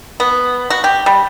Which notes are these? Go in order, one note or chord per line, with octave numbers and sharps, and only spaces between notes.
B3
F#4
G4
G3